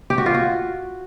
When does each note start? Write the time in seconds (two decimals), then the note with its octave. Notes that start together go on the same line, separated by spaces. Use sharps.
0.10 G4
0.18 F#4
0.26 F4
0.34 F#4